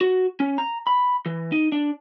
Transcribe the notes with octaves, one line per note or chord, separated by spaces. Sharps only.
F#4
C#4
A#5
B5
E3
D#4
D4